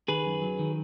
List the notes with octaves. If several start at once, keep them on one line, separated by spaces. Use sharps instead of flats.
D#3 G#4 B4
F#2
F#3
D#3